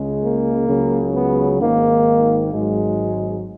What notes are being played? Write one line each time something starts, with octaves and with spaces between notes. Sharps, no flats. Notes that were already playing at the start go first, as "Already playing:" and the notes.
Already playing: C#2 C#3 G#3
A#3
C#2 C#3 F#3
B3
G#1 G#2 D#3 A#3
G#1 G#2 F#3 G#3